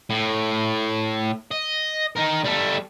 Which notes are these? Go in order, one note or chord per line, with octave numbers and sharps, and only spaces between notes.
A2
D#5
D#4 A#4
G3 A4